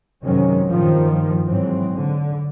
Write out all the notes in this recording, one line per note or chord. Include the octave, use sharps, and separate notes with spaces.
F#2 C3 D#3 F#3 G#3 C#4
G2 A#2 D#3 F3
G#2 E3 F#3 C4
D3